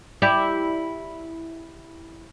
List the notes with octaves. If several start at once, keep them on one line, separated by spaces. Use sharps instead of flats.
E4 G4 D5